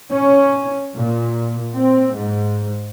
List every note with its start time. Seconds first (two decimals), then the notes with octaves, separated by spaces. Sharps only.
0.11 C#4
0.94 A#2
1.76 C4
2.18 G#2